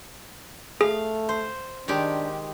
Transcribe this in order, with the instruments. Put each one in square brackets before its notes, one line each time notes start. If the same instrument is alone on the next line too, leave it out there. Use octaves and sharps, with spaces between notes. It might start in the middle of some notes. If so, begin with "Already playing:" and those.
[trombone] A3 [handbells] G#4 [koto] F5
[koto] C5
[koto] D#3 G#3 G4 [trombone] D4